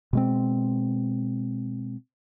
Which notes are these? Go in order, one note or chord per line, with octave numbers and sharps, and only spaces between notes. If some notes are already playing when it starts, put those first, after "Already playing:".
B2 G#3 C4